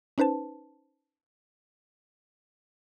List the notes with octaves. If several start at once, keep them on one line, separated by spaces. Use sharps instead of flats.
C#4 D#4 B4 C5 A5